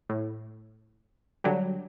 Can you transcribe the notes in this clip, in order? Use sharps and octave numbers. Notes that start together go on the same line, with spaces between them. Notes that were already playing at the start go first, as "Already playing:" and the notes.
A2
D3 F#3 G3